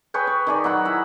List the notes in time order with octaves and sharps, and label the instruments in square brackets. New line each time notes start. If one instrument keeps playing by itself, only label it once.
[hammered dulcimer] G#4 B4 C#5 G5
C#5
D#3 G#4 D5
F#3 D#4 F#5 B5
E4 B5